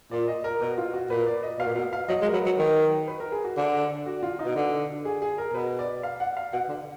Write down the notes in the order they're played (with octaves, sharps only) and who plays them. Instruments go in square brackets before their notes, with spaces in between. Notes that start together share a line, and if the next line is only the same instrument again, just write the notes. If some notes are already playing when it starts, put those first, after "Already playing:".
[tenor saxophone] A#2 [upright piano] D5
[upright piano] D#5
A#4
[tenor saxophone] B2 [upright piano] F#4
[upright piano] F4
F#4
[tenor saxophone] A#2 [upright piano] B4
[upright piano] D5
D#5
[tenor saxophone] B2 [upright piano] F5
[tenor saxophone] A#2
[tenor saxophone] B2 [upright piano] F5
[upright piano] F5
[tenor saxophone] F#3 [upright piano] D#5
[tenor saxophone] G#3
[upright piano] A#4
[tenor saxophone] F#3 [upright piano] B4
[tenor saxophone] F#3
D#3
[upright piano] B4
A#4
G#4
F#4
[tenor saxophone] D3
[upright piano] F#4
F4
D#4
[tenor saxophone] B2
D3
[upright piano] G#4
G#4
A#4
[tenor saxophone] B2 [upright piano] B4
[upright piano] D5
F5
F#5
F5
[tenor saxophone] B2 [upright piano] F#5
[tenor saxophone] D3